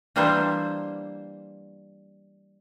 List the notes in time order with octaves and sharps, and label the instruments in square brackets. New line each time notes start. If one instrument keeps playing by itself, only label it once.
[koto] E3 G3 A#3 D4 C5 E5